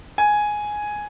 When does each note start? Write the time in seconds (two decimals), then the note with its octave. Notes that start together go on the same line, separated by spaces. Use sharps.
0.18 G#5